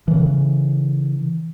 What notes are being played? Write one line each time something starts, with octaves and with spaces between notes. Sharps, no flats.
C#3 E3